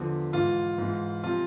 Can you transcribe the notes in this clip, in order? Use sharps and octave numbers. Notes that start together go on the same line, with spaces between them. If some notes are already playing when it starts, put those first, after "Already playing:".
Already playing: E2 D3 F3
G#2 E3 F4
G#2 E3
C3 F3 F4